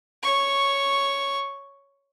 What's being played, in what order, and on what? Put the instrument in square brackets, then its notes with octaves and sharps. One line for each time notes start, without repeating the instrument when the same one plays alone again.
[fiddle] C#5 C#6